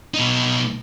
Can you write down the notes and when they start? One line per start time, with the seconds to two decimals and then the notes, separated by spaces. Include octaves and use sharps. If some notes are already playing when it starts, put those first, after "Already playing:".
0.14 B2 D#4